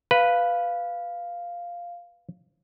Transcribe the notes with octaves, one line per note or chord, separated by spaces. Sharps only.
B4 F5